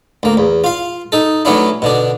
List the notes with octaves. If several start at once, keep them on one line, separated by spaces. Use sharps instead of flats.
D2 A#3
E2
F4 F5
D#4 A4
F#3 A3 B3 C#4 D4 E4
B2 D3 D4